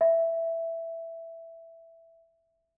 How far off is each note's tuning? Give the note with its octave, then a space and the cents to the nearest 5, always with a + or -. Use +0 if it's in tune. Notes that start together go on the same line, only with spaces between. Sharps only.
E5 +5